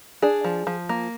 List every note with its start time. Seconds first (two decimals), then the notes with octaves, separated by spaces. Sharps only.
0.22 D4 G#4
0.44 F3
0.67 F3
0.89 A#3